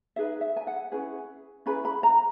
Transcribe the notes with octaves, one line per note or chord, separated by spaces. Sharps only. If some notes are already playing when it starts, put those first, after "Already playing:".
D#4 G#4 B4 E5
E5
G#5
F#5
C#4 E4 G#4 B4
C#4 E4 G#4 B4 B5
B5
A#5